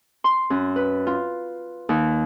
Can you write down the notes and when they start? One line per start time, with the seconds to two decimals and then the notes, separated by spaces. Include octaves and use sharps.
0.24 C6
0.50 F#2
0.76 B4
1.07 F4
1.89 D#2